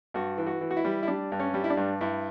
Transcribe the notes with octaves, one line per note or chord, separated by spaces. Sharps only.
G2 F#4
E3
F#4
E3
F#4
E4
G3
E4
G3 D4
G2
C#4
G3
E4
D4
G2
G2 E4